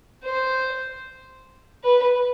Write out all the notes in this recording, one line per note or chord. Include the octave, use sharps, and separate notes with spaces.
C5
B4